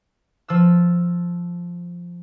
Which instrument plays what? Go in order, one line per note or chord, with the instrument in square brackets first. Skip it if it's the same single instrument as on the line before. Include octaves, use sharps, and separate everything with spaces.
[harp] F3 E6